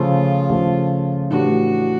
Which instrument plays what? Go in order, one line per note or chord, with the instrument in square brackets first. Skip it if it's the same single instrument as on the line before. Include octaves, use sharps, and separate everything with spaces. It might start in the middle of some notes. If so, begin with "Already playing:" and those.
Already playing: [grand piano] C#3 F3 A3 [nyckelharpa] F4
[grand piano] C#3 F3 A3
[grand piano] A2 E3 A3 D4 G4 [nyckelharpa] F#4